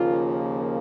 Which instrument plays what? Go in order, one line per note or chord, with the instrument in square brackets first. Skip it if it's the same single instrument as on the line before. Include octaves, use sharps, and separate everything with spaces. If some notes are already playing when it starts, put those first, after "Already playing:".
Already playing: [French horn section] D#2 C#3 F3 A#3 F4